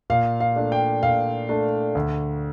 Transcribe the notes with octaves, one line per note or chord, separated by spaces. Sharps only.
A#2 F5
F5
A3 D4
G5
A#2 F5
A3 D4
D2